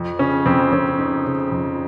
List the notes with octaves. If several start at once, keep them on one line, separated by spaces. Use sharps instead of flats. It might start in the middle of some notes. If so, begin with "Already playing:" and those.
Already playing: F2
C#3 C#4
F2 C4
F2 C#4
C#3 D#4
C#3
F2